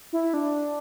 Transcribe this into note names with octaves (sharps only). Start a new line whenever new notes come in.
E4
D4